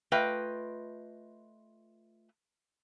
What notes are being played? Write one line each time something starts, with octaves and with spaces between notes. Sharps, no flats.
A3 F4 B4 D#5 G5